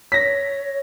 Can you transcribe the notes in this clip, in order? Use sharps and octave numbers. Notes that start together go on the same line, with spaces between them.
C#5 A#6 B6